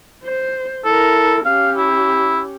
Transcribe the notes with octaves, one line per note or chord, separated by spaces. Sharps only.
C5
E4 A4 A#4
C#4 G4 F5
E4